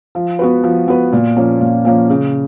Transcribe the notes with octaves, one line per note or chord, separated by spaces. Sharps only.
F3
B3 F#4 B4
F3
B3 F#4 B4
A#2
F3 A#3 C#4
A#2
F3 A#3 C#4
C#3